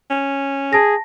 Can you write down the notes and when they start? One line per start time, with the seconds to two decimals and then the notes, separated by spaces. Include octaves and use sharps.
0.10 C#4
0.73 G#4 A5 A#6